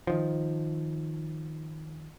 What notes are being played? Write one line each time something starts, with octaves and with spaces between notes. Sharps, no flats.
D#3 F3